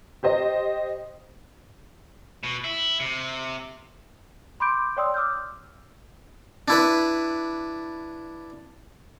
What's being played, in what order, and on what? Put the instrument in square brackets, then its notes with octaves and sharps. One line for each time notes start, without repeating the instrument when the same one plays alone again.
[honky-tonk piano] G4 C5 D#5
[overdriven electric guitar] B2
E4
C3
[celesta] B5 C6 D6 G6 D7
C#5 D5 G5 C6 D#6 E6
D6 E6 F6 G6
[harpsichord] D4 E4 B4